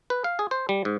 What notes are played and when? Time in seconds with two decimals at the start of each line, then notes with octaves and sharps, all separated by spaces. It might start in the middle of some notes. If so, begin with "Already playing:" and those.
0.10 B4
0.24 F5
0.39 G#4
0.51 C5
0.69 G3
0.85 G#2